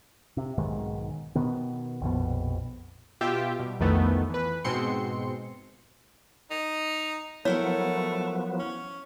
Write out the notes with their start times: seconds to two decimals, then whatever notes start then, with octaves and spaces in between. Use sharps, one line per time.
0.37 C3
0.58 B1 G#2 D#3 G#3
1.35 B2 D#3 B3
2.01 A#1 F2 B2
3.21 B2 F4 G4 E5 G5
3.59 B2 G3
3.79 B1 F2 D#3 E3 A3 B3
4.30 E3 B4
4.64 G#2 B2 G#3 C4 C6 C#7
6.50 D#4
7.45 F3 F#3 A3 B3 E4 A#4 C#5 F#5
8.59 C#4